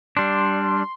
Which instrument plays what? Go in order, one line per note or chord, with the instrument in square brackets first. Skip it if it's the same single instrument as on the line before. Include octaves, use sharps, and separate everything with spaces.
[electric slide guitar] G3 D4 [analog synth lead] C6